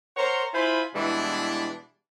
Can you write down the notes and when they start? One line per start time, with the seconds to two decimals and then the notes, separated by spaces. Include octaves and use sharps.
0.17 A#4 C5 C#5 F#5 A#5 C6
0.54 E4 F4 C5 F5 G#5 B5
0.95 B2 E3 G3 G#3 D4 E4